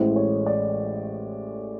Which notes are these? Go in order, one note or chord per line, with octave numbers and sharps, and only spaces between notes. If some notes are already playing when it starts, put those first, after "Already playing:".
Already playing: A1 A2 E3 G#3 C5
C#5
D5